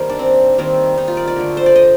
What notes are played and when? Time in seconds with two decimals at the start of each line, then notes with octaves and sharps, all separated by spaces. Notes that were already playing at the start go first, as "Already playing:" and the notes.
Already playing: D#3 G3 A#3 A#4 C5
0.10 D4
0.19 C4
0.58 D#3 G3 A#3 C4
0.98 D#4
1.08 F4
1.17 D5
1.28 D5
1.36 D3 A3
1.57 C5
1.66 D5
1.76 D#5